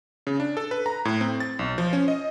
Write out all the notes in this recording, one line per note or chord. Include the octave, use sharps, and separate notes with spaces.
C#3
D4
A4
B4
A#5
A2
C4
A6
B1
F3
C#4
D#5